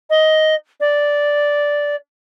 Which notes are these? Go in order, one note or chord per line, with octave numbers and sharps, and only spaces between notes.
D#5
D5